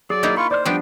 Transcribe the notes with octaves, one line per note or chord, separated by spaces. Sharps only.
F#3 G#4 D5
A#3 D#4 E4
F4 B5 C#6
C5 D5 F6
F3 G3 B3 D4 G5